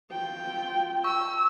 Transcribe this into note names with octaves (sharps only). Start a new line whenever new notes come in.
F4 G5
C#6 E6